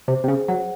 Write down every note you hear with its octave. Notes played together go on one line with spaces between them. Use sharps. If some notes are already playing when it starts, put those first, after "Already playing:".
C3 C5
C3
C#3 G#4
F#3 F#5